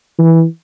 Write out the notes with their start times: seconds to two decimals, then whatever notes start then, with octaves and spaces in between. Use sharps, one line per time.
0.19 E3